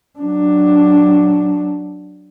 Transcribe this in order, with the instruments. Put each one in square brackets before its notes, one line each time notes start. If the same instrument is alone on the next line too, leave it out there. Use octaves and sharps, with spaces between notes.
[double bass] F#3 D4